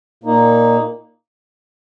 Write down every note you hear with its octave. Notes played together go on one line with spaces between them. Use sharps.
A#2 A#3 D#4